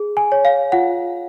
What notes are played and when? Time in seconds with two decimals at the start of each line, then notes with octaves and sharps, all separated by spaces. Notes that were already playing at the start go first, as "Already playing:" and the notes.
Already playing: G#4
0.17 G#5
0.32 C#5
0.45 F5
0.72 F4 F#5